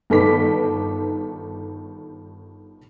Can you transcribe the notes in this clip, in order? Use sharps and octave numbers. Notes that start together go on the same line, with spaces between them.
G1 D#3 A4 B4 D6 B6